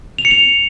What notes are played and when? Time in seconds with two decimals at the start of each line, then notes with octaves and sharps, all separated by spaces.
0.18 F7
0.25 C#7
0.31 F7